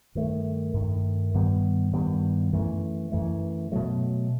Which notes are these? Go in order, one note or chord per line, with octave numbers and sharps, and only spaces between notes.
G2 D#3 A3
G2 D#3 A3
G2 D#3 G3 B3
G2 D#3 G3 B3
F#2 E3 A3
F#2 E3 A3
B2 F#3 A3